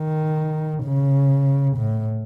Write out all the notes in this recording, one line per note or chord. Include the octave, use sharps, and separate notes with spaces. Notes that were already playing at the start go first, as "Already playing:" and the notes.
Already playing: D#3
C#3
A2